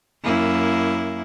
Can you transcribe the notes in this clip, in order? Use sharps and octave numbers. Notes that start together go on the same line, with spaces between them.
F#2 A#3 E4